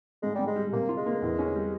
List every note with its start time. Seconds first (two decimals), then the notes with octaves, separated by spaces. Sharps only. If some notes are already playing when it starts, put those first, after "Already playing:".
0.23 G#2 G#3
0.35 G#2 G3
0.47 G#3
0.56 G3
0.72 C3 A#3
0.89 F4
0.97 G#3
1.06 A#3
1.22 E2
1.39 C#4
1.55 G3